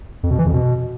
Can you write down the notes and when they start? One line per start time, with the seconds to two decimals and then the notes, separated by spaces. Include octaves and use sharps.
0.23 F2
0.31 B2
0.38 E3
0.46 F2
0.54 B2